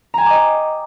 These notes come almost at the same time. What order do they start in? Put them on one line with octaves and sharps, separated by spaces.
A#5 G#5 G5 D6 D#5